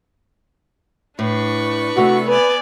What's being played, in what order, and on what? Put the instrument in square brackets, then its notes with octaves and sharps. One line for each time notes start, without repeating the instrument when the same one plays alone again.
[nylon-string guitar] A2 [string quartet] D4 B4 C#6
[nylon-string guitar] C3 A3 [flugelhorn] F#4
[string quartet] B3 D5 G#5 [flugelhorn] B4